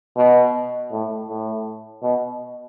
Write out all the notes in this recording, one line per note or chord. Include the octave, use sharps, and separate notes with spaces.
B2
A2
A2
B2